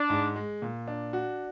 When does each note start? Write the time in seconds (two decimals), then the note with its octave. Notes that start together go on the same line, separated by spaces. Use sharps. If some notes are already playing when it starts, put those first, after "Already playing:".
Already playing: D4
0.10 G#2
0.36 G#3
0.62 A#2
0.88 D4
1.13 F#4